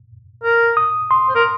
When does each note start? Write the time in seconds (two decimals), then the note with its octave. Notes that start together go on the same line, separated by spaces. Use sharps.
0.44 A#4
0.77 D#6
1.11 C6
1.29 C5
1.35 A#4